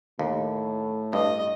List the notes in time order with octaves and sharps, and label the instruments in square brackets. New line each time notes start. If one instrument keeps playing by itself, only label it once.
[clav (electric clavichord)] D#2 [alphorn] A2
[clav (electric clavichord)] G2 [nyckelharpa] D#5